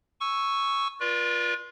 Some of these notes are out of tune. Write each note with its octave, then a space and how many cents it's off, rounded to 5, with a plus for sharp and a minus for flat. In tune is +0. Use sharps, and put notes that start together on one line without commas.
G#5 +0 C#6 +0 E6 +0
F4 +0 B4 -45 D5 +5